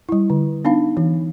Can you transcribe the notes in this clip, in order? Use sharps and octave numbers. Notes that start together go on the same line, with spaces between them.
G3 E4
D3
B3 D4 D#4 F5
E3